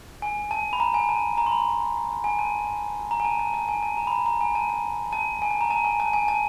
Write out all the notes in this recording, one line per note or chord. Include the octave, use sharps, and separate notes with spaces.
G#5
A5
B5
A#5
G#5
A5
A#5
C6
B5
G#5
A5
A#5
G#5
A5
A5
A5
G#5
A5
A#5
B5
A#5
A#5
G#5
A5
A5
A5
G#5
A5
A#5
A5
G#5
A5
G#5
A5